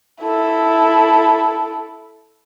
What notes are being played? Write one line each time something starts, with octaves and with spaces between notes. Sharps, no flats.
E4 A4